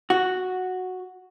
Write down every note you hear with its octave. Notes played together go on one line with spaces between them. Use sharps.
F#4